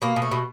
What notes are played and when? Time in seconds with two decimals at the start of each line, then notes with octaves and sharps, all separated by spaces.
0.02 B2 A#3
0.16 B2
0.22 A3
0.31 B2